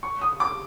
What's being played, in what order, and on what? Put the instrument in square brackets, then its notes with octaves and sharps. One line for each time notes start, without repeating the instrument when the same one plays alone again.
[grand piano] C#6
D#6
D6